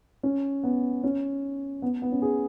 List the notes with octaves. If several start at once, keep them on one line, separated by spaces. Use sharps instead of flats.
C#4
B3
C#4
B3
B3
C#4
G#4